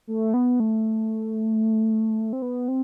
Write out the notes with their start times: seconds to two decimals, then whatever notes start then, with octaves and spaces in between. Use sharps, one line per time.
0.07 A3
0.34 B3
0.60 A3
2.33 C4
2.42 B3
2.68 C4